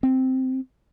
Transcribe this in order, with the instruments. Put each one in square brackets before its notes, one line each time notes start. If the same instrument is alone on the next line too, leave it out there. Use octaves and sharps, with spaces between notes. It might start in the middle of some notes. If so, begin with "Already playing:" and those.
[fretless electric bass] C4